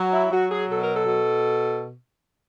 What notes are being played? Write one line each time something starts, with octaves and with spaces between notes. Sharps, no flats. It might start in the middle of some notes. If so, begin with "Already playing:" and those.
Already playing: F#3
E4
F#3 F#4
G#4
B2 A4
A#4
A4
B2